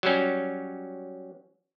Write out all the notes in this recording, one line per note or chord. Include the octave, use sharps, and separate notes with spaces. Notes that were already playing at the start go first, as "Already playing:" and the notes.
F#3 G3 C#4